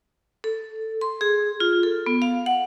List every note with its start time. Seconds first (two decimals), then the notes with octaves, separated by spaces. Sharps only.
0.44 A4
1.01 C6
1.21 G#4
1.60 F4
1.83 A4
2.06 B3
2.22 F5
2.46 F#5